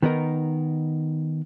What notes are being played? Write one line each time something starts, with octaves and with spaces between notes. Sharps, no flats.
D#3 B3 D#4 A#4